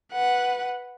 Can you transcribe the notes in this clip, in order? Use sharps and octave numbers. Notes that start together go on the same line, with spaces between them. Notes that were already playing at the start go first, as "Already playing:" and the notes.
B4 F#5